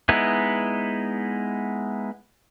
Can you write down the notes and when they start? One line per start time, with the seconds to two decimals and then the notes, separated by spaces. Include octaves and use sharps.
0.09 G#3 B3 D#4 E4